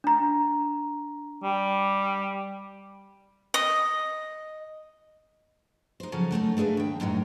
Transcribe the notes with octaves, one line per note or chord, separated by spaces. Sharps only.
D4 A#5
G3
D#5
D#4 C5
C#3 F3 F#3 C#4 A4
F#2 A3 D#4 A4
A3 D4 G#4 B4 F5
D#2 G5
F#2 A2 F#3 D#4